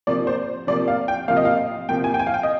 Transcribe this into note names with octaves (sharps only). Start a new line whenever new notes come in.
C3 F3 A#3 D5
C5
C3 F3 A#3 D5
F5
G5
C3 F3 A#3 F5
D#5
F5
C3 F3 A#3 G5
G#5
G5
G#5
F5
G5
D#5